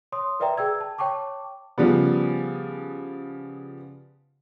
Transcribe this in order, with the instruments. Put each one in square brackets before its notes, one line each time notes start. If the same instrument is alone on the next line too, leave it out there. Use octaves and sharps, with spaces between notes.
[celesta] C#5 C6 D#6
A#4 B4 D5 E5 G5 A#5
G#4 G5 E6 G#6
A5
C#5 G5 A5 C#6 D6
[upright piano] C#3 F3 G3 B3